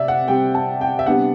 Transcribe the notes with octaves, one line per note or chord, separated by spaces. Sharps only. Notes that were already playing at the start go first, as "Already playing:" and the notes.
Already playing: C3 D5 E5
F#5
C3 G3 C4 G5
A5
G5
E5
C3 G3 B3 D4 F#5